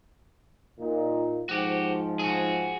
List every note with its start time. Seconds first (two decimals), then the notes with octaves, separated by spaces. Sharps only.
0.79 A#2 D#4
1.49 G#2 F3 F#4 G4
2.19 F#4 G#4